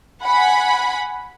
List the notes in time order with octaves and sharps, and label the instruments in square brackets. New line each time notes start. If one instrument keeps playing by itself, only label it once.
[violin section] F#5 G#5 B5